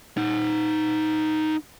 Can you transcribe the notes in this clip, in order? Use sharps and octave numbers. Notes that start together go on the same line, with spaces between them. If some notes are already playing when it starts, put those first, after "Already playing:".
D#4 F#5